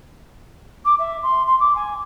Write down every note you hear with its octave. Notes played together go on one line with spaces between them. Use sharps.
D6
E5
C6
C6
D6
G#5